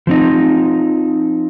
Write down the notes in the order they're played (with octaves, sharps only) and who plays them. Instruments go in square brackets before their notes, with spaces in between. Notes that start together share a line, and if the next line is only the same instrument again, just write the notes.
[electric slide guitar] F3 C4 D#4